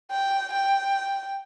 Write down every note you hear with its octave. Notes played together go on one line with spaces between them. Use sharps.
G5
G5